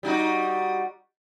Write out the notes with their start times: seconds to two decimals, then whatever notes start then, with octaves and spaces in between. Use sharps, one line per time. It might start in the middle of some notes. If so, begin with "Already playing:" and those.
0.03 G3 D#4 F#4